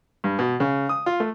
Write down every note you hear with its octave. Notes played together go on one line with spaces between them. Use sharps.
G2
B2
C#3
D#6
F4
A3